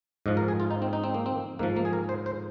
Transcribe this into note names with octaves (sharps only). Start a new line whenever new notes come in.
G#2 F3 D#5
A#4
G#4
F4
D#4
C4
D#4
C4
A#3
C4
G#2 F3 A#3
A#3
G#4
A#4
C5
C5